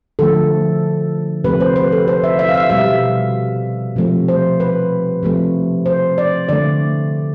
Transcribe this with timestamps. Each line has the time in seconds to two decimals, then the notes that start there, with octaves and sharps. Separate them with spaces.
0.19 D3 F3 A3 A4
1.44 C3 F3 A3 B4
1.60 C5
1.76 B4
1.92 A4
2.08 C5
2.24 E5
2.39 E5
2.49 F5
2.55 E5
2.70 B2 G3 E5
3.96 C3 F3 A3
4.28 C5
4.60 B4
5.23 C3 F3 A3
5.86 C5
6.18 D5
6.49 D3 A3 D5